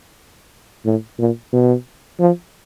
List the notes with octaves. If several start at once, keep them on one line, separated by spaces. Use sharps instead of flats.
A2
A#2
B2
F3